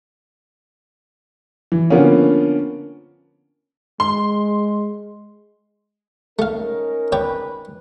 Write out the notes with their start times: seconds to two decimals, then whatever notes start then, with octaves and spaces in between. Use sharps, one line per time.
1.72 E3
1.90 D3 F3 A#3 B3 C#4
4.00 G#3 C6
6.39 A3 C#4 D#4 A#4 F5
7.12 B4 C#5 D5 G5